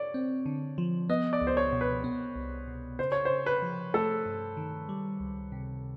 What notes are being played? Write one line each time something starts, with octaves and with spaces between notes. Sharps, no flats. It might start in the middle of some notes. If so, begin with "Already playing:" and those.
Already playing: C#5 D5
C4
D3
F3
B3 D#5
D5
C#2
C5
C#5
B2
B4
B3
C2
B2
C#3 C5
C#5
C#3 C5
B4
F3
A3 A4
G2
D#3
G3
C#2
C3